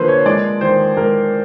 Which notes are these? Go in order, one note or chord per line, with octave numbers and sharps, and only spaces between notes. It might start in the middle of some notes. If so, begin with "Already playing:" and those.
Already playing: D3 F3 A#3 A4 B4 C5
C#5
G#3 D5
D#3 C5
G#3 A#4